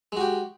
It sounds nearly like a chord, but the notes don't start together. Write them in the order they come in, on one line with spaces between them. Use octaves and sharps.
G#3 F#4 G4